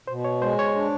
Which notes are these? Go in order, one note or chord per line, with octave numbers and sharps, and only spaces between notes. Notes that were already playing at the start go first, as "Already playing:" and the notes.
B2 C5
C#5
G#3 C5
C#5
D4